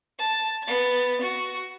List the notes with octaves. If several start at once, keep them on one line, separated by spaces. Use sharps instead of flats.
A5
B3 A6
F#4